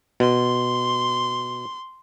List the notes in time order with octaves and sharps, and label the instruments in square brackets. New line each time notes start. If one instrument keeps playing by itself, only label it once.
[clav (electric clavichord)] B2 [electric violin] C6